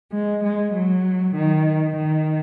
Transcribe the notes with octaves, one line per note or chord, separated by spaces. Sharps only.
G#3
G#3
F#3
D#3
D#3